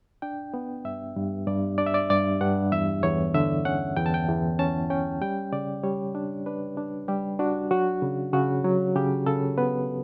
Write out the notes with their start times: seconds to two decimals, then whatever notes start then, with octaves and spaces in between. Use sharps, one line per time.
0.22 D4 G5
0.54 B3
0.85 G2 E5
1.16 G2
1.47 G2 D5
1.78 D4 D5
1.86 E5
1.94 D5
2.10 G2 D5
2.41 G2 F#5
2.72 E2 E5
3.03 E2 C#5
3.34 D3 E5
3.65 C#4 F#5
3.97 E2 G5
4.06 A5
4.14 G5
4.28 E2
4.59 C#4 A5
4.90 C#4 G5
5.21 G3 G5
5.52 C#3 D5
5.83 G3 C#5
6.15 D4
6.46 D4 B4
6.77 D4
7.08 G3 G4
7.39 D4 F#4
7.71 F#3 F#4
8.02 C#3
8.33 C#3 F#4
8.64 F#3
8.95 C#3 G4
9.26 C#3 A4
9.58 B3 B4